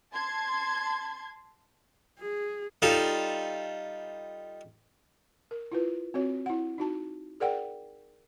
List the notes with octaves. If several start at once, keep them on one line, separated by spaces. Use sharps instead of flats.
A5 C6 G#6
G#4
G3 D#4 F4 A4
A#4
E4 F4 B4
C4 F#4 C#5
E4 F#5
D#4 F#4 A5
G#4 A#4 D5 F#5 G5